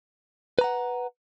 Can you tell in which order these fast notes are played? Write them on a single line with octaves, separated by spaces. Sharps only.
B4 A#5 F#5